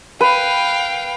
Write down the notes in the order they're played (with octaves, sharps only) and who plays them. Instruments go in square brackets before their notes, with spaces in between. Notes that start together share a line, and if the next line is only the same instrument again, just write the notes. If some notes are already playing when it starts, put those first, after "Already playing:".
[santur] B4 [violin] F5 G5